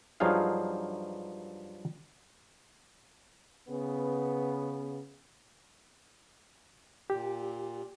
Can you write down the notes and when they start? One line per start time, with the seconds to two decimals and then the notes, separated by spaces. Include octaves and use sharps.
0.20 G2 F3 F#3 D#4 G#4 F5
3.69 C#3 B3
7.10 A#2 G4